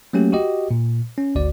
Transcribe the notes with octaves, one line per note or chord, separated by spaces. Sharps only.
F#3 A3 A#3 C#4 F#4 G4
F#4 G4 D#5
A#2
C#4
G#1 D2 F#4 D5